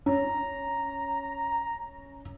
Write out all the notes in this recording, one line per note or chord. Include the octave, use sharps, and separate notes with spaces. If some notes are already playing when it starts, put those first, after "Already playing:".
C#4 A#5